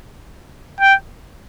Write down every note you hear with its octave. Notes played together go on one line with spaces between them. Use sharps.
G5